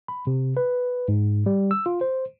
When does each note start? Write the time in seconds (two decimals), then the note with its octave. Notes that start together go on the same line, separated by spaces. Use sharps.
0.08 B5
0.27 C3
0.57 B4
1.08 G#2
1.46 G3
1.71 E6
1.86 F4
2.01 C5